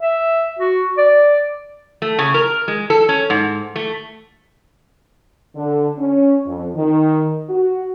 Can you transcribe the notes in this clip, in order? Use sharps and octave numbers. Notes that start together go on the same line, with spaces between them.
E5
F#4
D5
A3
C#3
A#4
G#3
A4
C#4
G#2
A3
D3
C#4
F2
D#3
F#4